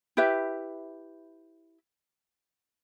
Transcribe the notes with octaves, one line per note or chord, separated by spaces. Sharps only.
E4 G4 B4 E5